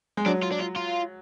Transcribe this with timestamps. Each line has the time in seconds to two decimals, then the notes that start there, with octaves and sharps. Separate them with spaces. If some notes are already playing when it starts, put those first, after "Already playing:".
0.17 G#3
0.26 F#3 D4
0.43 F4
0.51 D4
0.59 F4
0.76 F4